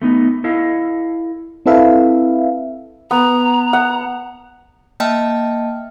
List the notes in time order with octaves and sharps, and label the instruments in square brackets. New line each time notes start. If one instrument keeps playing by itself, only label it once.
[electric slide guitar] A3 B3 D#4
E4 A4 D#5 F5
[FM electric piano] C4 E4 A4 B4 E5 F5
[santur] B3 [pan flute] A#5
[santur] F#5
[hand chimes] A#3 D#5 E5 G5 A5 F6